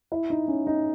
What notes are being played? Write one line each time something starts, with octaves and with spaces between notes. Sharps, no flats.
E4
D#4
C#4
D#4